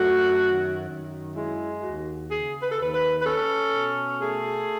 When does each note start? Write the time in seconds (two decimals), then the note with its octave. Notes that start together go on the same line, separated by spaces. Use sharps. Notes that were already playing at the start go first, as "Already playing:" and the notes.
Already playing: F#2 A3 F#4
0.40 D#3
0.88 F#2
1.35 G#3 E4
1.82 D#2 F#4
2.30 C#3 G#4
2.61 B4
2.71 A4
2.78 D#2 B4
2.93 B4
3.19 B4
3.25 C#4 A4
3.73 B2
4.19 A3 G#4